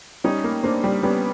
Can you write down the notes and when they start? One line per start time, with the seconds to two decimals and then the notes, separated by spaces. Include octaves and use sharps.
0.24 G3 C#4 D#4
0.44 A#3
0.63 A#3 C4 D4
0.84 G3
1.03 G3 B3 C#4